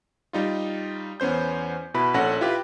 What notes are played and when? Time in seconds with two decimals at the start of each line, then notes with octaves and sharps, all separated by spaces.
0.33 G3 D#4 F4
1.20 E2 B3 C#4 C5 G6
1.94 B2 E4 B4 B5
2.14 A#1 C#4 A4 F#5 F#6 A#6
2.41 E4 F4 G4 B4